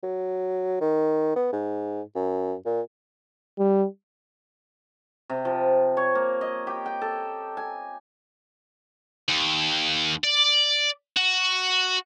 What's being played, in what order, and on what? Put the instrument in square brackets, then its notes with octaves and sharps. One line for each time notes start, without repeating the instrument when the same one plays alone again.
[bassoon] F#3
D#3
B3
G#2
F#2
A#2
[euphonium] G3
[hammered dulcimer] C3
F3
C#5
A#3
D#5
G4
G5
A4
G#5
[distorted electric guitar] D#2
D5
F#4